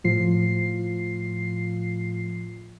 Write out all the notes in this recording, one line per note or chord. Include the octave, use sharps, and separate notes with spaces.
A2 F3 F4 C7